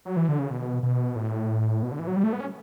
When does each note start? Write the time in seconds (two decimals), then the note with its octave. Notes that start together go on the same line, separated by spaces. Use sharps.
0.05 F#3
0.17 E3
0.29 D3
0.39 C#3
0.50 B2
0.83 B2
1.16 A2
1.83 B2
1.92 D3
1.99 E3
2.07 F#3
2.16 G3
2.24 A3
2.33 B3
2.40 C#4